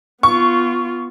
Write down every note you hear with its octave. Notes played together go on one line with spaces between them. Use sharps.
B3 F4 C#6